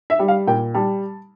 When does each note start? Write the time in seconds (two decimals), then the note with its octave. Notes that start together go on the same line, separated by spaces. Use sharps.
0.10 E5
0.19 G3
0.28 F5
0.47 A#2 G5
0.74 G3 A5